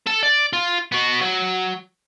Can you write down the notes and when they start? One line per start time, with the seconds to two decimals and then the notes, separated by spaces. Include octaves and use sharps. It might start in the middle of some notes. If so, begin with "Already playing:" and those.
0.07 A4 A5
0.23 D5
0.53 F4
0.92 B3 F#4
1.21 F#3